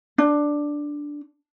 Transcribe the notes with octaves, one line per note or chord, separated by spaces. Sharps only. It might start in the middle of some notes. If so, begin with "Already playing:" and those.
D4